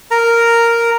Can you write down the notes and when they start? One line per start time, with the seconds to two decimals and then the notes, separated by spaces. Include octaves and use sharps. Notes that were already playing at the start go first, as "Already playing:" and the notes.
0.11 A#4 A#5